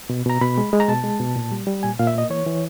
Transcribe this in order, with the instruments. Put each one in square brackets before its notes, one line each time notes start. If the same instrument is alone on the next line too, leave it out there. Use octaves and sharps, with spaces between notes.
[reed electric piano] B2
B2 A#5
B2 B5
G#3
G#3
A#5
B2 A5
G#3
B2
A#2
G3
G3
A#2 G#5
A#2 F5
E5
A#3 D#5
E3 C#5
E3